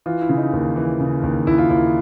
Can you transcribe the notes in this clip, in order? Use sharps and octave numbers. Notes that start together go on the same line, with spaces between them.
E3 F4
E4
C#3
D#4
D#2
E3
C#3
D#2
D#2 E4
F4
D#2 E4